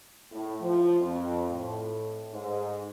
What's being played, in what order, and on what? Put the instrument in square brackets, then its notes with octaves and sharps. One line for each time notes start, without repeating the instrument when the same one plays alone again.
[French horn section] A2
F3
F2
A2
G#2